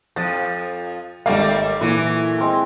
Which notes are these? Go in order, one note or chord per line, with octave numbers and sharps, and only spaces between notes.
F2 F3 D#6 E6 A6
G#1 G3 A3 A#3 F5
A#2 E3 F#3 E4
G#3 C4 A#4